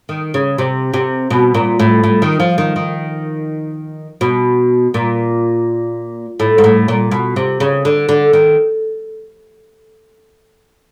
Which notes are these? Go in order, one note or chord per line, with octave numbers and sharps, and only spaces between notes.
D#3
C#3
C3
C3
B2
A#2
A2
A2
D#3
F3
D#3
D#3
B2
A#2
A2
G#2
A2
A#2
B2
C3
C#3
D3
D3
D#3